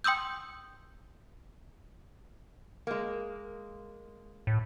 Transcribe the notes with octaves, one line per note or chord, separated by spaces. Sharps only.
G5 C6 D#6 E6 G6
G#3 A#3
A2